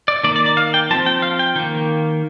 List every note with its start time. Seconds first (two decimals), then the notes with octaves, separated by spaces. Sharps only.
0.08 D5
0.23 D#3 A#3 D5
0.36 D5
0.46 D5
0.57 F5
0.74 G5
0.90 F3 C4 A5
1.06 G5
1.22 F5
1.39 G5
1.56 D#3 A#3